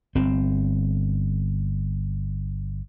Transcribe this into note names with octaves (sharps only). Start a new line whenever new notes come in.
G1 C4